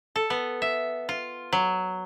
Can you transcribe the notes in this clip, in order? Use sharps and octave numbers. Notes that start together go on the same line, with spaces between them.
A4
B3
E5
F4
F#3